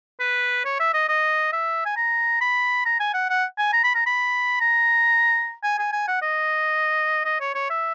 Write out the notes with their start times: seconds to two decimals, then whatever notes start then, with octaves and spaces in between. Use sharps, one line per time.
0.20 B4
0.65 C#5
0.80 E5
0.94 D#5
1.09 D#5
1.53 E5
1.86 G#5
1.97 A#5
2.41 B5
2.86 A#5
3.00 G#5
3.14 F#5
3.30 F#5
3.59 G#5
3.73 A#5
3.84 B5
3.95 A#5
4.06 B5
4.61 A#5
5.64 G#5
5.79 G#5
5.93 G#5
6.08 F#5
6.22 D#5
7.25 D#5
7.41 C#5
7.55 C#5
7.70 E5